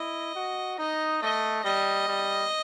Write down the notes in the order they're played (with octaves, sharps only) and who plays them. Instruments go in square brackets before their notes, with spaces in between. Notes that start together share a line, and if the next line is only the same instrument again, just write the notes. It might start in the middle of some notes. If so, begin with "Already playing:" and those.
Already playing: [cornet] E4 [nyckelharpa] D#5
[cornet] F#4
[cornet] D#4 [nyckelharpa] D#5
[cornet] A3 [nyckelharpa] D#5
[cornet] G3 [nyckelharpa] D#5
[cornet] G3